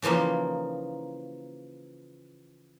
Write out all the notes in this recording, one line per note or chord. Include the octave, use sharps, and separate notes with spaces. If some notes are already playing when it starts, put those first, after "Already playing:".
C#3 E3 F3 A#3 D#4